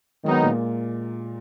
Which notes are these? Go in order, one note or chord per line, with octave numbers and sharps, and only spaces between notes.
D#3 F#3 G#3 B3 D#4
A#2 A#3